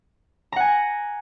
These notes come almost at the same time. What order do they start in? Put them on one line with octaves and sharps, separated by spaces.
A#5 F#5 G#5